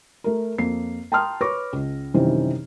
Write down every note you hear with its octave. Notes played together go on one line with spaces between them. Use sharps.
A3 A#4
F2 A#3 C7
G5 A5 A#5 C6 D#6 F6
B4 C#5 C#6 D6 A#6
C#2
F#2 C3 D#3 E3 G3 C4